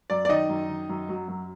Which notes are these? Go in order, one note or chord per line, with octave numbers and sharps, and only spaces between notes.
F#2 D5
D5
D#3 D#4 D#5
F#2
D#3
F#2
F#3
F#2